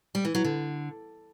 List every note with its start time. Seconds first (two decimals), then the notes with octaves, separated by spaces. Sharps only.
0.15 G3
0.25 E3
0.35 F#3
0.44 D3